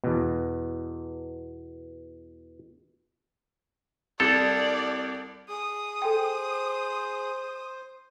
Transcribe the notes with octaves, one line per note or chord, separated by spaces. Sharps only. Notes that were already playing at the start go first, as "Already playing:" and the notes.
E2 B2
C2 A4 D5
G#4 D#6
A4 C5 G5